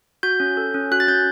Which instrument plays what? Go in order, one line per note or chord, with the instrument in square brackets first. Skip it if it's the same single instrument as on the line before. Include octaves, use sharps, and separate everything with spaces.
[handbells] F#4 G6
C#4
A4
C#4
F#4 F#6
A6
C#4 G6